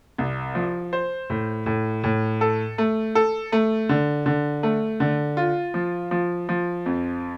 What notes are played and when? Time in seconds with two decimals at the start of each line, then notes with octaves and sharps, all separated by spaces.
0.18 C2
0.55 F3
0.93 C5
1.30 A2
1.66 A2
2.04 A2
2.41 A4
2.78 A3
3.15 A4
3.52 A3
3.89 D3
4.26 D3
4.63 A3
5.00 D3
5.37 F4
5.74 F3
6.11 F3
6.49 F3
6.86 F2